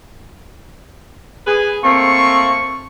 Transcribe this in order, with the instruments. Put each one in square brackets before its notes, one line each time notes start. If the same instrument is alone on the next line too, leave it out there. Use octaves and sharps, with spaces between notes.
[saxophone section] G#4 B4
[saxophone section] A3 A#3 C4 [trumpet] C#6